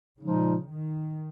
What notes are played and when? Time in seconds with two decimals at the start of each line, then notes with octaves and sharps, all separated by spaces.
0.18 A#2 C#3 F3 G#3 D#4
0.70 D#3